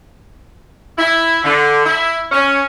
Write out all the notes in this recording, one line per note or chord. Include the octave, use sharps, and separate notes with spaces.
E4
D3
E4
C#4